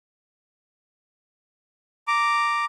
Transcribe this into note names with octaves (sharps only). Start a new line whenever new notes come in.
A#5 D6